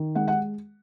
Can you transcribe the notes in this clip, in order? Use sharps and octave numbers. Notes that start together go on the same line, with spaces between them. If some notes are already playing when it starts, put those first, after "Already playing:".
Already playing: D#3
G#3 F#5
F#5